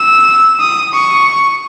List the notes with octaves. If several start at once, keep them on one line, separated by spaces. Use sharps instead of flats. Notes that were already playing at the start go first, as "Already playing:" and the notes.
Already playing: E6
D#6
C#6